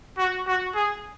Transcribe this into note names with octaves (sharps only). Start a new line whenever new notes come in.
F#4
F#4
G#4